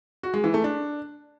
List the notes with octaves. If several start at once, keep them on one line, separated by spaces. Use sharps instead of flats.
F#4
G#3
E3
A3
D4